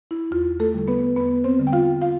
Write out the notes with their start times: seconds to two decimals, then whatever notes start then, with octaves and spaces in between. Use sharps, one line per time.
0.11 E4
0.31 E2 F4
0.60 A3 A4
0.74 D3 G3
0.88 B3 B4
1.16 E2 B3 B4
1.44 C4 C5
1.59 D3 G3
1.67 G5
1.72 F4 F5
2.02 F4 F5